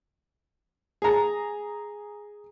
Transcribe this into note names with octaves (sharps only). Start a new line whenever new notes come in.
G#4 A#5